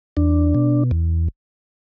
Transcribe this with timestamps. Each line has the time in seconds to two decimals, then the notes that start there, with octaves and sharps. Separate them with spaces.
0.17 E2 D4
0.55 B2
0.91 E2